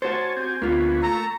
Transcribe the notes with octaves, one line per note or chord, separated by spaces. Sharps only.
F#4 C5 C#5 G#5 A5
C4 G4 G#5
D2 A#3 B3 C#4 F4
A3 A#5 C#6 E6